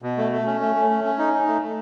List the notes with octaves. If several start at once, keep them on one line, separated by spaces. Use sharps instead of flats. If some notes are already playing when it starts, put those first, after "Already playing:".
B2
A3
A3
C#4
A3
A3
C#4
C#4
D#4
D#4
A3
A3